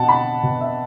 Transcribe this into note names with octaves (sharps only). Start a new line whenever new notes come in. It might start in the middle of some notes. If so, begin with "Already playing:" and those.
Already playing: B2 F#5 A5
B5
B2
E5